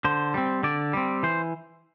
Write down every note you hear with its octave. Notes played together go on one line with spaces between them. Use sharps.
D3 C5
G3 C4
D3 D5
G3 C4
E3 C5